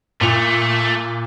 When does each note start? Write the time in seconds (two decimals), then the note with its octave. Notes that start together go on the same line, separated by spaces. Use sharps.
0.21 A#2 A3 F7